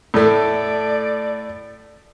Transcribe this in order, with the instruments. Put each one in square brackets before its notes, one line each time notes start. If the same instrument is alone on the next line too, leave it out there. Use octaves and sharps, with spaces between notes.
[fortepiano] A2 A3 [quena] D5